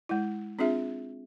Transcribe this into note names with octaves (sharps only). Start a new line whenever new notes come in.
G#3 E4
C4 D4 F4 G#4 E5